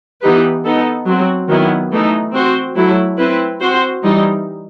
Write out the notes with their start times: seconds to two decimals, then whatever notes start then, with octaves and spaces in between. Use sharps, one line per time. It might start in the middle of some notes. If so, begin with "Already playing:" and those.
0.21 E3 B3 D#4 G4 B4
0.64 B3 D#4 A4
1.06 F#3 C4 F#4
1.48 D#3 F#3 B3 E4
1.91 E3 A3 D#4
2.33 C4 F#4 C5
2.76 F#3 A3 E4
3.17 C4 E4 B4
3.60 C4 F#4 C5
4.03 E3 G3 D#4